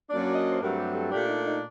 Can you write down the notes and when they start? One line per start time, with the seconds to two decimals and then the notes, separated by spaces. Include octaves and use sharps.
0.10 F#2 F#3 A#3 D4 D5
0.35 D#5
0.50 C5
0.61 G2 F#3 A3 C4 A#4
0.78 G4
0.95 A4
1.11 A#2 A3 D4 G4
1.29 D#4
1.46 D#4